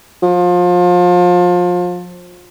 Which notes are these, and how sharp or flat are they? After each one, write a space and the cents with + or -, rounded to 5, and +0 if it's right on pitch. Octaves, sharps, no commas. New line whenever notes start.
F3 +30